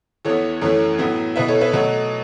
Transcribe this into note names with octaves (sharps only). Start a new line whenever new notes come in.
E2 E3 B3 E4 A4 C#5
F#2 E3 A3 A4 C#5
A2 F#3 B3 E4
B2 B3 E4 B4 E5
A4 C#5
B4 E5
B2 F#3 A3 A4 C#5